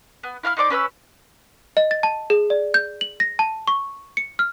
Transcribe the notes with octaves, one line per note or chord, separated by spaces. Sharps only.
B3
E4 F5 A#5 F6
D#4 C5 D5 D6
C#4 B4 B5 E6
D#5
A6
A5
G#4
D5
G6
F#7
A#6
A5
C#6
C#7
F6